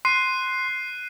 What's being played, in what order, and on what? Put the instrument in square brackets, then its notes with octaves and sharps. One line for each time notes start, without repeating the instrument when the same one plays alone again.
[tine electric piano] C6 [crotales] F#6 C7 D#7